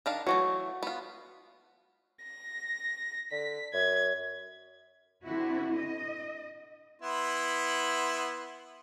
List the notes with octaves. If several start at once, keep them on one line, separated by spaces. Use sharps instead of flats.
D#3 D4 F5
E3 F#3 A3 F#4 C#5
B3 F4
A#6
D3 B6
F#2 G#6
D3 C4 E4 F#4
D#5
B3 E4 C6